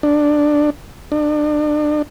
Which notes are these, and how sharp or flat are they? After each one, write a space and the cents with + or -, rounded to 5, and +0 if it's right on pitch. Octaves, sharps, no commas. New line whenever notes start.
D4 +5
D4 +30